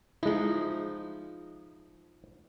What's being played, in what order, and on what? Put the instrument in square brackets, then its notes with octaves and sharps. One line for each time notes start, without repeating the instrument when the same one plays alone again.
[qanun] F3 D#4 [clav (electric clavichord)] G#3 E4